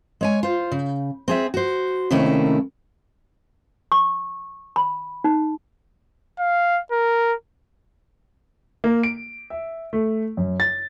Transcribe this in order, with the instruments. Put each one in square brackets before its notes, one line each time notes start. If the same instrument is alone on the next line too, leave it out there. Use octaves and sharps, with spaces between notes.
[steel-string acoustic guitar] G#3 C#5 G#5
F4 C5
C#3
C4 G#4 E5
F#4 C5
C3 D#3 A3 A#3 C#4 E4
[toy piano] C#6
B5
D#4
[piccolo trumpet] F5
A#4
[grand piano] A#3
D7
E5
A3
F#2
A6